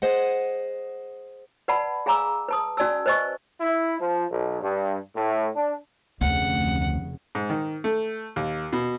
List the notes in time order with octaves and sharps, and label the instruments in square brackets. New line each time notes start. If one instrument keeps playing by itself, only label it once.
[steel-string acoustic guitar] G#4 C5 D#5 F#5
[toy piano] B4 D5 F#5 A5 B5
G#4 F5 G#5 A#5 D6 E6
B4 A5 D#6
C#4 F#4 D5 G#5 A5 E6
B4 C5 D#5 G#5 C#6
[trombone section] E4
F3
B1
G2
A2
D4
[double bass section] F1 C#3 [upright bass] D2 [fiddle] F#5
[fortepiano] G#2
D#3
A3
D#2
B2